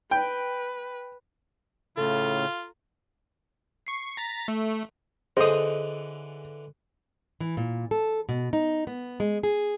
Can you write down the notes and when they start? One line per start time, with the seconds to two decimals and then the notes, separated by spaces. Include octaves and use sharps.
0.11 B4 G5
1.97 A2 C#3 F4 A4
2.23 A#5
3.87 C#6 C7
4.17 A#5 A6 B6
4.48 A3
5.37 D3 E3 G#4 A4 C5 D#5 D#6
7.41 E3
7.57 A#2
7.91 A4
8.29 B2
8.53 D#4
8.87 B3
9.20 G#3
9.43 G#4